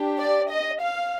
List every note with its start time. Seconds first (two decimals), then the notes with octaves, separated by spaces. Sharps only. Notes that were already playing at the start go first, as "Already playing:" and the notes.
Already playing: D4 G4
0.19 D5
0.50 D#5
0.80 F5